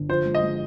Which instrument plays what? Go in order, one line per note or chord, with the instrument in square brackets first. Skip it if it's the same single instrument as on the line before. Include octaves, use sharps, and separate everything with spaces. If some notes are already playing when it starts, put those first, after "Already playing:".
Already playing: [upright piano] G1
[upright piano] F3 [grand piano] C5
[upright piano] G#3
[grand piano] D#5
[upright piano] G#3